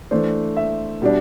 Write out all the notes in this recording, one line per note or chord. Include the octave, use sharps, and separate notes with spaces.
E3 A3 D4 C5
E5
B2 G3 D4